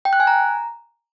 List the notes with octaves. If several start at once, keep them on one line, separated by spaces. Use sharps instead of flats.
G5
F#6
G#5
A#5